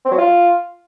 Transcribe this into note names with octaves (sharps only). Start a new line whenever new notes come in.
C4
F#3
F4